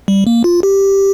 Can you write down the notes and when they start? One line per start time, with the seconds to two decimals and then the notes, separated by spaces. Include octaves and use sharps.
0.08 G3
0.27 A#3
0.44 F4
0.63 G4